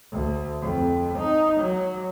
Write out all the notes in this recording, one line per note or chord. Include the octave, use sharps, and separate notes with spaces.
D2
F2
D#4
F#3